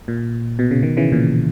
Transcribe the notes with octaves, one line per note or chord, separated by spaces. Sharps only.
A#2
B2
C#3
B2 D#3
C#3 E3
A#2 C#3